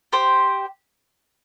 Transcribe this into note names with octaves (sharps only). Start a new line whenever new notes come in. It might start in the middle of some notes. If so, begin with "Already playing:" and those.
G4 C5 G5